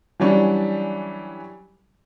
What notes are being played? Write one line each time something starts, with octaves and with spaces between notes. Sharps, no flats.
E3 F#3 G3 C#4 D4